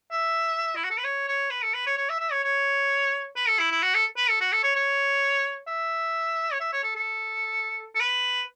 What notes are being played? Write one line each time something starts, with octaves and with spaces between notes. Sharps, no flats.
E5
E4
F#4
A4
B4
C#5
C#5
B4
A4
B4
C#5
C#5
E5
E5
C#5
C#5
B4
A4
E4
E4
F#4
A4
B4
A4
F#4
A4
C#5
C#5
E5
C#5
E5
C#5
A4
A4
A4
B4